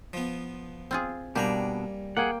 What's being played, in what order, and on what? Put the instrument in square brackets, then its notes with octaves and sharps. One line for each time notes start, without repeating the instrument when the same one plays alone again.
[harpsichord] F3 B3
[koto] C4 F4 G#4
[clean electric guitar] B2 D4 [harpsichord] G3 G#5 A#5 [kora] A#3 [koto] G4
[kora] A#3 G5 [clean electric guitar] G#4 F#5